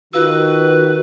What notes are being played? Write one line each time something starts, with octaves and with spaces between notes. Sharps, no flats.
D#3 F4 F#4 B4 F5 E6